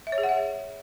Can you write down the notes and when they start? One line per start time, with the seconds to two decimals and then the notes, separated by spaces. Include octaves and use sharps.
0.07 E5
0.12 C#5
0.18 G#4
0.23 F#5
0.29 E5